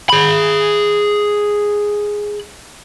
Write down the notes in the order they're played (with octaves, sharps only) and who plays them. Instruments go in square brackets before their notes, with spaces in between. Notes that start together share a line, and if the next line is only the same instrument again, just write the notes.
[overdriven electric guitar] G#4 B5